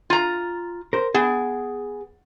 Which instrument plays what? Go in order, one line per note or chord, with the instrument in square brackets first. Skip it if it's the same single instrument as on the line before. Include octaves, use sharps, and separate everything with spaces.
[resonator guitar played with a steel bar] F4 A#5
[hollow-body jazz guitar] A#4 C5
[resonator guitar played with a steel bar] B3 [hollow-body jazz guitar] G#4